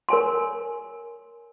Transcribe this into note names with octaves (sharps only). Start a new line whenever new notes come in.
A#4 C#5 G#5 C6